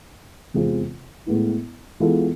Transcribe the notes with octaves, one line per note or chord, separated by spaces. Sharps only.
E2 C3 G#3 C4 F4
A2 G#3 B3 E4
E3 G#3 B3 F4 A4